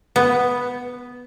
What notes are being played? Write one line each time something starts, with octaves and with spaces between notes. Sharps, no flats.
B3